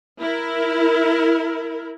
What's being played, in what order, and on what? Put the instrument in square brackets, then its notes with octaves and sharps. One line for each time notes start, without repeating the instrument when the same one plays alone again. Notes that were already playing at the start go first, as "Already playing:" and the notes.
[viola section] E4 A#4